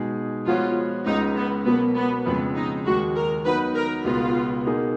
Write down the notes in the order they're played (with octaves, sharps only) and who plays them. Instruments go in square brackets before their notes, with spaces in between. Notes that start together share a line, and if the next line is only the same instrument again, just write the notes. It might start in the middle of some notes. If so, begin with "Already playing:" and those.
Already playing: [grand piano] B2 G#3 D#4 G#4
[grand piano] F3 G#3 B3 F#4 C#5 [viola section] F4
[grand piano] C#2 C#3 G#3 [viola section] D#4
[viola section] B3
[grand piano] B2 F#3 A#3 [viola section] B3
[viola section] B3
[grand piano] F2 C#3 G#3 [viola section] B3
[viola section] D#4
[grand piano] D#2 D#3 G#3 [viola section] F#4
[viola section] A#4
[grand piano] D#3 F#3 B3 D#4 F#4 [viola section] B4
[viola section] A#4
[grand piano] C#2 B2 G#3 B3 F#4 [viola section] F4
[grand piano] B2 A#3 D#4 G#4